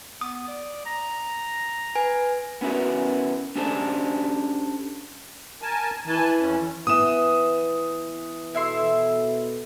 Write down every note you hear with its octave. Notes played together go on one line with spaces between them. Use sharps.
B3 D#6
D5
A#5
B4 G#5
B3 C#4 E4 F#4 A#4 B4
C#4 D4 G4 A4 C5 D5
A#4 G#5 A5
E3 G#5 A5
F2 C#4
E3 B3 D#6 E7
B2 E4 A4 E5 C6